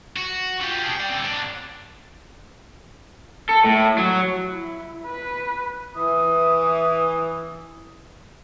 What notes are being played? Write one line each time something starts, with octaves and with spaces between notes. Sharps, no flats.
F#4
F4 G4
D4 G#4
D5 G5
D3 C4
G#2 D4
A4
A2
F#3
E4
B4
E3 D#6